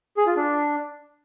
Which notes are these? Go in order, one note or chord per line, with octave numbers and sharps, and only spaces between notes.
G#4
F4
D4